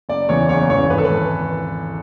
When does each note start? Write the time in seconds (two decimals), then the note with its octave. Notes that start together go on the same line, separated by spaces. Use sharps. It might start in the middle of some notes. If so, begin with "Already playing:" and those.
0.09 F#1 D5
0.29 E2 C#3 E3 C#5
0.49 F#1 C#5
0.70 E2 C#3 E3 C#5
0.90 G#1 B4
0.98 A4
1.05 B4
1.10 E3